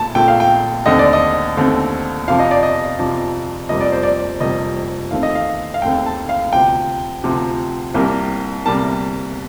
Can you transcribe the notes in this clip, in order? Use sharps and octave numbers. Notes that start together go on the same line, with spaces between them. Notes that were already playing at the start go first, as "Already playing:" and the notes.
Already playing: A#1 A#2 A3 A5
A#1 A#2 A3 G5
F5
G5
D#2 D3 A3 C4 D#5
D5
D#5
D#2 D3 A3 C4
F2 C3 F3 F5
D#5
D5
D#5
F2 C3 F3
F1 F2 C3 G3 A#3 D#5
D5
C5
D5
F1 F2 C3 G3 A#3 D#5
D#2 D#3 A3 C4 F5
D#5
F5
F5
D#2 D#3 A3 C4 G5
A5
F5
D2 C3 F3 G5
D2 C3 F3
C2 C3 G3 A#3
C3 G3 A#3 A5